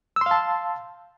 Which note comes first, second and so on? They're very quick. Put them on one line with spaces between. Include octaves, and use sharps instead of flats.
E6 C6 F5 A5